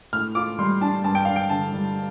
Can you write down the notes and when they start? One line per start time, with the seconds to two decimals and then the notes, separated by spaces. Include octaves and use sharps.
0.13 A2 F6
0.35 F4 D6
0.59 G3 C6
0.81 D4 A5
1.04 G2 A5
1.15 G5
1.25 D4 F5
1.36 G5
1.50 D3 A5
1.73 G3